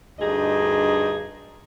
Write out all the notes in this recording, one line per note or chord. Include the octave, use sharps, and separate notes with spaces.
D2 G2 D#4 G#4 D#5